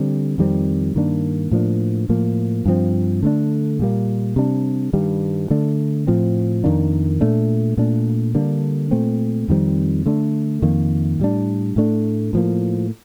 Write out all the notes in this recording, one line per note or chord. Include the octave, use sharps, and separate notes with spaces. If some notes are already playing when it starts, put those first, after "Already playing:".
Already playing: D3 G3 C4
F2 D#3 G3 C4
G2 D#3 A#3 D4
A2 F3 A#3 D4
A2 F3 A#3
G2 F3 C4
D3 A3 D4
A#2 G3 A#3
C3 G3 D4
G2 D#3 G3
D3 A3 D4
A2 F3 C4
F2 D#3 A#3 D4
A#2 A3 D4
A#2 A3 D4
D3 G3 A#3 D4
A#2 A3 C4
F2 D#3 G3 C4
D3 A3 D4
F2 D#3 A#3
A2 G3 D4
A2 A3 D4
A2 F3 A#3